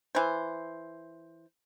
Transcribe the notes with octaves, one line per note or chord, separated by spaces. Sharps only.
E3 C5